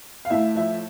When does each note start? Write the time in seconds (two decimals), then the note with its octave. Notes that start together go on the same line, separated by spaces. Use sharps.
0.25 F5
0.30 A2 E5
0.55 F3 E5